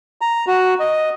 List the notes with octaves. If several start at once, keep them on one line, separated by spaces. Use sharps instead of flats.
A#5
F#4
D#5